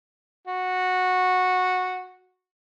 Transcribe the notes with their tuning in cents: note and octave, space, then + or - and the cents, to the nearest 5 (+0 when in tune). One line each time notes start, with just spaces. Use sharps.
F#4 -10